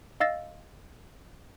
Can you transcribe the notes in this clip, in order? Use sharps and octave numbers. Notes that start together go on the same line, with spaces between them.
D#5 F5 E6 A6 A#6